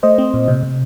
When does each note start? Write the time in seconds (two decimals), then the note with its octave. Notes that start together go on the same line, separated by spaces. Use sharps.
0.03 A3 C5 D#5
0.18 C4
0.34 A#2
0.48 C3
0.63 C3